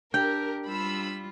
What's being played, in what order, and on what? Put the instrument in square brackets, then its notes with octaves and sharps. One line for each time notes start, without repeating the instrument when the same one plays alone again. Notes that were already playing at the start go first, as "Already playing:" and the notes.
[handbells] D4 [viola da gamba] G4 [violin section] A#4 [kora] G5
[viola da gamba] G3 F4 [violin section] B5 E6